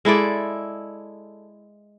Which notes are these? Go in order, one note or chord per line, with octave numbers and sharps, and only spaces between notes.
G#3 E4 A4 D5